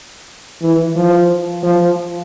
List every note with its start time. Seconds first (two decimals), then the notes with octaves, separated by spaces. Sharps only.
0.62 E3
0.96 F3
1.63 F3